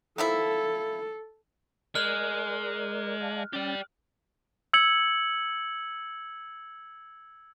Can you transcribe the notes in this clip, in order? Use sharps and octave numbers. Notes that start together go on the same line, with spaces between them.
D#3 F3 E4 A4
G#3 A#4 D5 F6 F#6
D5 F5 A5
C#4 G4 D5 G5 A6
E6 G#6 C#7 F#7